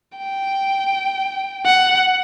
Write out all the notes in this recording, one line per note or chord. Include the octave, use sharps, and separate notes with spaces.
G5
F#5